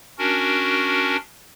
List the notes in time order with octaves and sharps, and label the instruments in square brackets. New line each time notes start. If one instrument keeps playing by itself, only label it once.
[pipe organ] C#4 D4 F#4 A#4